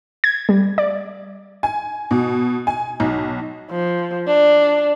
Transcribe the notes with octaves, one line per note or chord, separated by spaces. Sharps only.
G#6
G3
D5
G#5
B2
G#5
B1
F3
D4